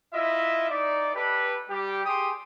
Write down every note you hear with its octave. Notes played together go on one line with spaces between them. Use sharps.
E4 F4 D#5 E5
D#4 D5
G4 A4 B4
G3 G4
G4 G#4 G5 C6 D#6